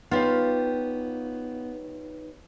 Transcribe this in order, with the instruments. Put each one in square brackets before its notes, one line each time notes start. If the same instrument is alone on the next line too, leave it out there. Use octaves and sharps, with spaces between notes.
[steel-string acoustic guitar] B3 [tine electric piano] D#4 B4 C#5 [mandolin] F4 G4